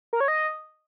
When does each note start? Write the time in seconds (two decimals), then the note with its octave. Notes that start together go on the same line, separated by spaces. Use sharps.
0.13 A#4
0.20 C#5
0.28 D#5